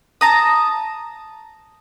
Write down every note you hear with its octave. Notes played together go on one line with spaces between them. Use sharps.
A5 A#5 D#6